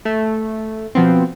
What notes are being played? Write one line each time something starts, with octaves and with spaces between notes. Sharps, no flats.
A3
B2 F3 B3 C4